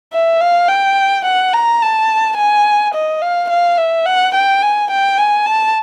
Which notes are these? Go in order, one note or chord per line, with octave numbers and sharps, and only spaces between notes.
E5
F5
G5
F#5
A#5
A5
G#5
D#5
F5
F5
E5
F#5
G5
G#5
G5
G#5
A5